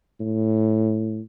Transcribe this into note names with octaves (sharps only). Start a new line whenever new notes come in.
A2